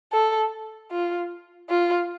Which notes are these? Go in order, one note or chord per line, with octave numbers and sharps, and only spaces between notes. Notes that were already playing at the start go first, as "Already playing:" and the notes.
A4
F4
F4